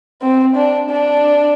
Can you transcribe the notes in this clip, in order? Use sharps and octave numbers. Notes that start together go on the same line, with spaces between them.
C4
D4
D4